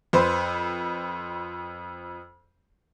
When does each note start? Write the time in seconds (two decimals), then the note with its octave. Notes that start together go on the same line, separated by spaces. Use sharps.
0.13 F2 B4 C5